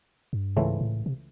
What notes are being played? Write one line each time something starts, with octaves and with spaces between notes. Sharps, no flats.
G2
C#2 G#2 C#3 E3 A3 C4
A2
C3